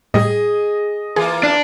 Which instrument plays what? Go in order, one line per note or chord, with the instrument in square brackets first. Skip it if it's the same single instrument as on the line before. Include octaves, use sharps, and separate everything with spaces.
[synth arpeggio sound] A2 G3 [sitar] G#4 [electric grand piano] D#5
[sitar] E3 A#3 F4 [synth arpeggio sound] G#4
[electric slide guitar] D4